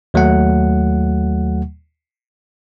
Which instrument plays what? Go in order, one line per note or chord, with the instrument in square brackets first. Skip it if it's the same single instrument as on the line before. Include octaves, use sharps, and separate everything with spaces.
[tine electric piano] D#2 F#3 A3 F#5